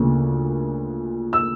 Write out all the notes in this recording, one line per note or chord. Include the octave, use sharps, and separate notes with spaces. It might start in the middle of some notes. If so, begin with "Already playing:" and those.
Already playing: D2 C#3 F3 A#3
E6